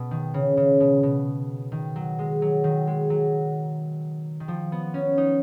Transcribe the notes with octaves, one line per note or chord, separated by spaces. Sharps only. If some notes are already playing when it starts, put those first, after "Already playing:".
Already playing: B2
D#3
C#3
C#3
B2
B2
D#3
F#3
G#3
F#3
D#3
G#3
F#3
D#3
F3
B3
C#4
D#4